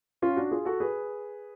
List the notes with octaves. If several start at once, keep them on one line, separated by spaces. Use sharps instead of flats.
C#4 F4
D4 F#4
F4 G#4
F#4 A4
G#4 B4